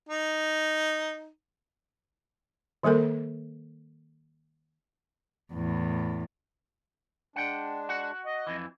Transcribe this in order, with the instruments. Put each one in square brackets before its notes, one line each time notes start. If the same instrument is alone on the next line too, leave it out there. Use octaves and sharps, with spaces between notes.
[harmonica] D#4
[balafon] D#3 G3 A#3 A4 A#4
[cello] E2 A2
[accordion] G#3 D4 [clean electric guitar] F#5 G5
[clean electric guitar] F#4 F#5
[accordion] D#5
[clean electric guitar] F2 E3